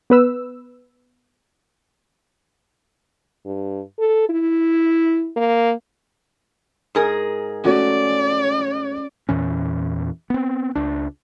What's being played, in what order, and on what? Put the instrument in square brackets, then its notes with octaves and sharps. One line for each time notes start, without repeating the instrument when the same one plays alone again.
[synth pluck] B3 B4 E6
[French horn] G2
A4
E4
A#3
[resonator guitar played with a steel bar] G#2 G#4 A#4
[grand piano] A3 F#4 [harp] C#4 [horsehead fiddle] D5
[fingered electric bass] E2 A#2 E3 C#4
B3 C4
C#2 D4